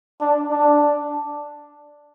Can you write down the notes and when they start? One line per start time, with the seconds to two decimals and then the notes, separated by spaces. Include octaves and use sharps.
0.21 D4
0.51 D4